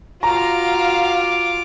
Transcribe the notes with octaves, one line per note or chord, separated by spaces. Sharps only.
F4 F#4 F5 A#5 D6